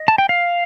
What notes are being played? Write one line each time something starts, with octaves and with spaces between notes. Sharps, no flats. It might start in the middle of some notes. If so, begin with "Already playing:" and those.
Already playing: D#5
A5
G5
F5